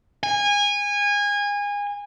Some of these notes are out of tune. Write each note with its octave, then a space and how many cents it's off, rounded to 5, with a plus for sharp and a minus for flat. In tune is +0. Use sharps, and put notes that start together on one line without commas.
G#5 -25